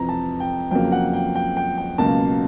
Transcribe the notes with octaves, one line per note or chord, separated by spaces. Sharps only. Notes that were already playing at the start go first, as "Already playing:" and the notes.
Already playing: F2 C3 E3 A#5
A5
G5
F2 C#3 F#3 A#3 G5
F#5
G5
G5
G5
G5
C#2 B2 F#3 A#3 A5